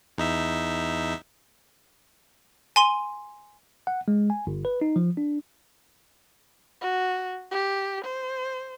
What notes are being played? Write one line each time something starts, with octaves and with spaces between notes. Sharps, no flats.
E2 D#4 E5
G#5 C6 D#7
F#5
G#3
G#5
G1
B4
D#4
F3
D4
F#4
G4
C5